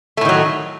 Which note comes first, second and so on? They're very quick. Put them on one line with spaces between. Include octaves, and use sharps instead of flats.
A3 A2 D#3 F#3